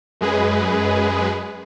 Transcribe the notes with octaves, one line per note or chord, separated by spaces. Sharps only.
F#2 G#3 G#4 B4